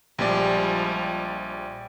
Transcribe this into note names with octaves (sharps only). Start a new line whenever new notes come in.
A#1 F3 G3 G#3 G4 D5 G#5